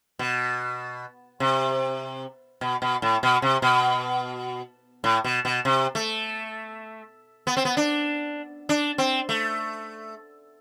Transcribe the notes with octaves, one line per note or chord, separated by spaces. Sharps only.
B2
C3
B2
B2
A2
B2
C3
B2
A2
B2
B2
C3
A3
B3
C4
B3
D4
D4
C4
A3